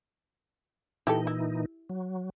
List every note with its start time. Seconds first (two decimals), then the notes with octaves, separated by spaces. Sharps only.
1.07 A#2 E3 D#4 E4 G4 A4
1.27 E4
1.90 F#3